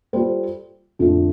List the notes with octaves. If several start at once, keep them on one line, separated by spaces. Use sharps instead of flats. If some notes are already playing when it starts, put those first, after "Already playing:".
G3 F4 A4 C5
F2 D3 F3 A3